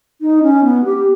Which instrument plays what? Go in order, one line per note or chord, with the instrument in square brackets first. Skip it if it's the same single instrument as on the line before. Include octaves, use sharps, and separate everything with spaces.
[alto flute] D#4
C#4
B3
G4